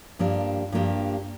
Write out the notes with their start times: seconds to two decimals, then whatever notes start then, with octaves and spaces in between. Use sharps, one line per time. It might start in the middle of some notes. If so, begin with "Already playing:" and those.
0.19 G2 F3 A#3 D4 G4
0.72 G2 F3 A#3 D4 G4